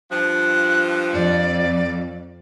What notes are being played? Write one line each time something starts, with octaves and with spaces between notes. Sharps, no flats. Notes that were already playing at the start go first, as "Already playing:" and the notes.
G2 F3 F#6
F2 D5